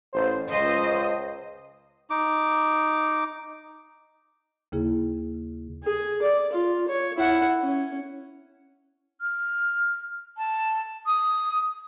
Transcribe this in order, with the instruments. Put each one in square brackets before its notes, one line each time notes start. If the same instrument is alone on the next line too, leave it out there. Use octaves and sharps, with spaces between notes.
[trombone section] A1 C5
[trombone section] C#2 [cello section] C5 D#5
[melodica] D#4 D6
[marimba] D#2 C#3 A#3 E4 G#4
[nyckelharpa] G#4
D5
F4
C#5
E4 F#5
C#4
[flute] F6
A5
D#6